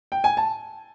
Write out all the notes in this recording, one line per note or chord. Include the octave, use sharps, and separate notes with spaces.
G5
G#5
A5